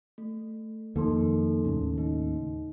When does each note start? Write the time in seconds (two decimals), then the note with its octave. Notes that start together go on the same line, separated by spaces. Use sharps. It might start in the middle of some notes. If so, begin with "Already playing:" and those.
0.18 A3
0.96 F2 D#3 A#3 D#4 A4 C6
1.65 D#2 A2 C#3
1.98 D#4